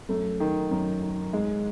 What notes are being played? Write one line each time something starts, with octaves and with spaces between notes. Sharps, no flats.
F#2 A3
D#3
F#2
D#3
G#2 G#3